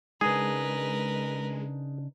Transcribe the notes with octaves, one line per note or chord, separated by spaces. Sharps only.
C#3 G#3 D4 D#4 G#4 A#4 B4